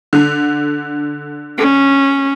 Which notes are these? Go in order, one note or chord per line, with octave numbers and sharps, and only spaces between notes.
D3
C#4